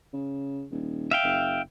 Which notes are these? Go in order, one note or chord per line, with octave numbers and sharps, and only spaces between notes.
C#3
D#1
E5 F5 G5
F#1